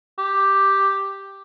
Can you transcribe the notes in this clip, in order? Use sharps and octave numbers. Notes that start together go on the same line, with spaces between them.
G4